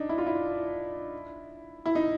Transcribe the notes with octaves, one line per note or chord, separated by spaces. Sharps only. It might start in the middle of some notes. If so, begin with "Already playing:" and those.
Already playing: D4 D#4
E4
F4
E4
E4
D#4